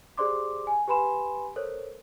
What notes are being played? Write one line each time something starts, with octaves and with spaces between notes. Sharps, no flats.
G4 G#4 C5 D5 C6 D6
G#5
G4 B4 G#5 B5 C6 E7
A4 A#4 C5 C#5